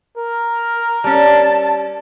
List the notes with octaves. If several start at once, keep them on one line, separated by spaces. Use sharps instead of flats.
A#4
G3 C#4 A5